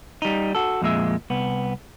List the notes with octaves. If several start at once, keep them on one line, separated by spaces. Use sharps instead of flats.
G3 D#4
F#4 A4
F2 A#2 G#3 E5
C2 B3